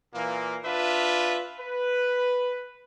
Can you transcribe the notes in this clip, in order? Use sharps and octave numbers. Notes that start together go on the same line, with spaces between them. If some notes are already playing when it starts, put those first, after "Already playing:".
A#2 E3 A#3
D4 F4 B4 E5
B4